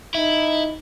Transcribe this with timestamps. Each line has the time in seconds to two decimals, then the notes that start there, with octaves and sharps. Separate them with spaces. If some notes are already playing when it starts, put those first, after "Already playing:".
0.15 D#4 E4